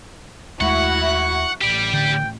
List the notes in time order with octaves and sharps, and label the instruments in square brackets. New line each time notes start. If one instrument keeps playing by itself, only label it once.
[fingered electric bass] D#2 G#3 A3 [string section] E4 F#4 [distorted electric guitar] F#5 [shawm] C#6
[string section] A1 [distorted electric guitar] G4 D5
[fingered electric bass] D3 [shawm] G5